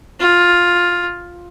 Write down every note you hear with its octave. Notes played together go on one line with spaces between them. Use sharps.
F4